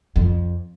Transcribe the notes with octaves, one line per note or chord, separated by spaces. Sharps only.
F2